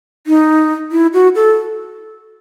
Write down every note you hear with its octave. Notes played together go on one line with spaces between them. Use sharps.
D#4
E4
F#4
A4